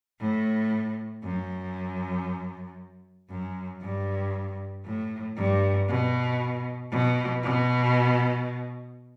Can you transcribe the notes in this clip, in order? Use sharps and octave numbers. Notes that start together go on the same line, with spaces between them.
A2
F#2
F#2
G2
A2
G2
B2
B2
B2